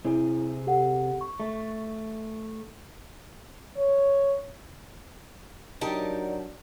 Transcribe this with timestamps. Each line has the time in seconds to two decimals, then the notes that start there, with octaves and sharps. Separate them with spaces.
0.05 C3 C4 E4 G#4
0.67 G4 A4 F#5
1.21 C#6
1.40 A3
3.76 C#5
5.81 F#3 D4 D#4 G4 A#4 A5